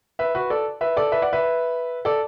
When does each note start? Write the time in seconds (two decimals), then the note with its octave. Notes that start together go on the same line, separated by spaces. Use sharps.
0.19 B4 E5
0.35 F#4 B4
0.50 A4 D5
0.81 B4 E5
0.97 A4 D5
1.12 B4 E5
1.22 D5 F#5
1.33 B4 E5
2.05 A4 D5